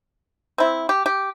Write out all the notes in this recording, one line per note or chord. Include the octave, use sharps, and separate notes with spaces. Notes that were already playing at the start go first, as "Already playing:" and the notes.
C4 E4
G4
G4